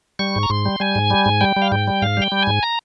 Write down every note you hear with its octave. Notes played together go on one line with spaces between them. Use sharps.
G3 C#6
G#2
A#5
G#2 C6
G3
G3 G#5
G#2
G3
G#2
G3 G5
G3
F5
G#2 G5
G3
G#2 F5
G3 G5
G3
G#2 G#5
A#5